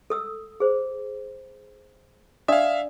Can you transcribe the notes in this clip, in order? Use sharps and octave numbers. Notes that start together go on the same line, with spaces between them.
A4 D#6 E6
G#4 C5
D4 D5 E5 F5 D#6